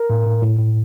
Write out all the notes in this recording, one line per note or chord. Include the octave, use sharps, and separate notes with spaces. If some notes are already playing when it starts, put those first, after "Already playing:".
Already playing: A#4
A2
A2
A2
A2